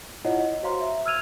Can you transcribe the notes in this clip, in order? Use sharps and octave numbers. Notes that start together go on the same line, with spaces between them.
E4 F4 C#5 D#5 F#5
D#5
F#4 C5 C#5 F5 A#5 C6
E5
E6 F6 G#6 D#7 F7